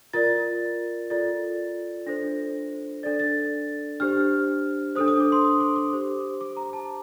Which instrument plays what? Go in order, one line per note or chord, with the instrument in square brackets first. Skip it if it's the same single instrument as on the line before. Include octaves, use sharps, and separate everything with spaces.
[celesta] F4 A#4 D5 A6
F4 A4 D5 A6
D4 A4 C5 A#6
D4 A4 D5 A6
A6
D4 G4 C5 F6
D4 A4 C5 D#6
D#6
D6
C6
D#6
D6
D6
G4 C5
D6
A#5
A5